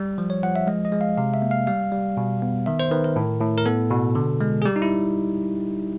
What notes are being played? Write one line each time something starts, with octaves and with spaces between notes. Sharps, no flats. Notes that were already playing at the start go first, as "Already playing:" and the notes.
Already playing: G3
F3
C#5
F3 F#5
E5
G#3 D#5
D#5
G#3
F5
C3 F5
E5
A#3
F5
G3 F5
G3
B2
B3
D#3 E5
C5
D#3 B4
A#4
A2
A2
A#4
B3 A4
B2
D3
G#3
G#4
G3 G4
D#4
E4